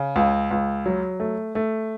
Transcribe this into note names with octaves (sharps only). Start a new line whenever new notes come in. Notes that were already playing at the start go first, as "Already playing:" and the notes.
Already playing: C#3
C#2
C#2
F#3
A3
A3